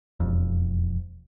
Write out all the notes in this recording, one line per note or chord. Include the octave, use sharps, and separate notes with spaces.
E1 F2